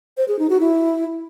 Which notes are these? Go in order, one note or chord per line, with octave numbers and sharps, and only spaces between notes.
C5
G#4
D#4
F#4
E4